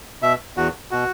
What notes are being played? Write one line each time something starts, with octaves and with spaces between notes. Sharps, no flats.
B2 E5
E2 F#4
B2 F#4